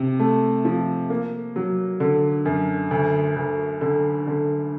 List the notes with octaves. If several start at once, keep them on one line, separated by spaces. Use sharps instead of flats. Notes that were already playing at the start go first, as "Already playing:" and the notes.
Already playing: C3
A3
F3
A#3
F#3
D3
F#2
D2
D2
D3
D3